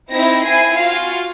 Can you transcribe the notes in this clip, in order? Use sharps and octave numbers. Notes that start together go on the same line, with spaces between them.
C4 D#4 E4 A#6
E4 G#5 C7
F4 F#4 F5